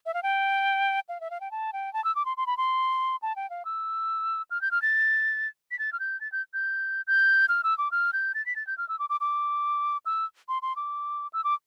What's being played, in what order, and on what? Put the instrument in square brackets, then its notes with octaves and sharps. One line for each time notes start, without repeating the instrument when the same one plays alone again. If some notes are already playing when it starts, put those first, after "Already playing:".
[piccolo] E5
F5
G5
F5
E5
F5
G5
A5
G5
A5
E6
D6
C6
C6
B5
C6
A5
G5
F5
E6
F6
G6
F6
A6
B6
A6
F6
G6
A6
G6
G6
G6
F6
E6
D6
F6
G6
A6
B6
A6
G6
F6
E6
D6
D6
D6
E6
C6
C6
D6
E6
D6